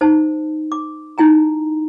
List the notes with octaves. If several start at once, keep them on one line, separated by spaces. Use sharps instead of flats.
D#4 C5 A5
D6
D#4 E4 G#5 A#5